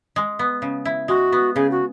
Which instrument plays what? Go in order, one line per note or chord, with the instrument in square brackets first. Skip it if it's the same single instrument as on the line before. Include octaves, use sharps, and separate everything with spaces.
[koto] G#3
B3
C#3
E4
[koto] G#3 [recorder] F#4
[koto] B3
[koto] C#3 [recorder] G#4
[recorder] F#4